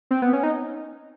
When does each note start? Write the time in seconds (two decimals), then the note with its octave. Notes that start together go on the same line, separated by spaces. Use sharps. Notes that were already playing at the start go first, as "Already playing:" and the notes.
0.11 C4
0.22 B3
0.33 C#4
0.43 D#4